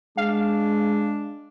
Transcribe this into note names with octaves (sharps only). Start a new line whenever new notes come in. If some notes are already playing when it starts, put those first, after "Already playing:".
G#3 D4 F5